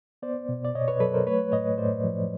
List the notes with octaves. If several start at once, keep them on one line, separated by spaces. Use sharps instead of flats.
B3 C5 D5
B2
D5
B2 C#5 D#5
B4 C#5
F#3 A4 B4
A#4 C5
A3 B4 C#5
A2 C#5 D#5
A2 C5 D5
F3